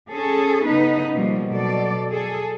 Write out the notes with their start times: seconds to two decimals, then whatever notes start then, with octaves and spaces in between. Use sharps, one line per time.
0.11 C#4 G#4 A4
0.66 C#3 B3 D#4 B4
1.13 B2 F3 G3 A#3
1.51 B2 F#3 A4 D5
2.11 G#4 A4